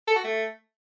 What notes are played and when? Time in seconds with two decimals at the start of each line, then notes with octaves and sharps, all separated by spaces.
0.08 A4
0.16 F#4
0.24 A3